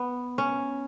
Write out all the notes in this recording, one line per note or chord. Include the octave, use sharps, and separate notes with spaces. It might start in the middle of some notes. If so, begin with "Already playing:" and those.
Already playing: B3
C#4